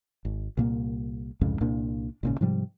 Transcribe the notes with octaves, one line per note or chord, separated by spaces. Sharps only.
G#1
C2 A#2 A#3
C2 F2 G#2 C#3
C2 A#2 A#3 D4
G#1 A#2 C#3
G#2 C3 F3 G3